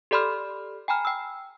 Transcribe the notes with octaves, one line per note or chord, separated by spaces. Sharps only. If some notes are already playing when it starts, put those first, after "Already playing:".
G4 A4 D5 B5 C6 F6
G5 G#5 A#5 B5 F6
G5 E6